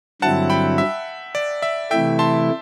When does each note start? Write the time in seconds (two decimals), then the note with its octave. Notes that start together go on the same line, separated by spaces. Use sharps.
0.22 G2 D3 F#3 C4 E4 F#5 A5
0.50 G5 B5
0.78 E5
1.35 D5
1.62 E5
1.91 C3 E3 A3 E4 E5 G5
2.19 A5 C6